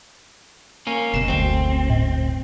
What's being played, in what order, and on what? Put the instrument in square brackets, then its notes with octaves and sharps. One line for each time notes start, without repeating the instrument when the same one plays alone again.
[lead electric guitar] A#3 C#4
[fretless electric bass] F1 B2 [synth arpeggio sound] C7 E7
[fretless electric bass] F#1 D2 [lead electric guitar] C4
[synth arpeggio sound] A2